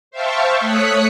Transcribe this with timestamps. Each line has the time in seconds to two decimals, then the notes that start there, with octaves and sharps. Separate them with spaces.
0.11 C5 E5 F5 G5 A5 C#6
0.60 A3 C#5 D#6 F#6 B6 C#7